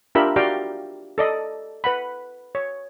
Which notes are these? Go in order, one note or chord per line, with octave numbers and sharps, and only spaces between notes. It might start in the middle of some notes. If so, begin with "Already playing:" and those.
D4 F4 G4 A#4 E5 B5
F#4 G4 D5 F5 G5 A#5
A4 D5 D#5
B4 F#5 B5
C#5